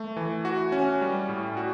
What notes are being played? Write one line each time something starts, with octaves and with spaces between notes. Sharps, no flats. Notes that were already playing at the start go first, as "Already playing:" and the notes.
Already playing: A3
E3
F#4
C#4
G3
A2
F#4